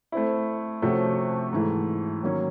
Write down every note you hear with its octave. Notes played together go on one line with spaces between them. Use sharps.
A3 C4 E4
C3 F3 A3 C#4 F#4
G#2 E3 A3
D#3 F#3 A#3 C#4